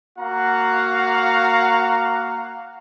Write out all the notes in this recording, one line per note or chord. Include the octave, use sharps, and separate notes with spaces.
A#3 F#4 F5 F#5 A#5